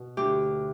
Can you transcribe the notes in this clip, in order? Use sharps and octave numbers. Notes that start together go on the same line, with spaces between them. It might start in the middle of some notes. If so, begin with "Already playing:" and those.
Already playing: B2
D2 G4